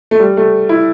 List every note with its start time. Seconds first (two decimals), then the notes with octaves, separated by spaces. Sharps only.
0.11 A3
0.19 G3
0.37 A3
0.69 E4